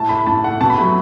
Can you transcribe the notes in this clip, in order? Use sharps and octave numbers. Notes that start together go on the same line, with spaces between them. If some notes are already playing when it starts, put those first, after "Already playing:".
Already playing: A2 A5
A3 B5
A2 A5
A3 F#5
B2 A5
B5
F#3 A3